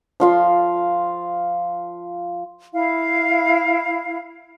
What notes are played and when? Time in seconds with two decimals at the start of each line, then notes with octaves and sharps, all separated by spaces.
0.20 F3 F4 F5
2.73 E4 F5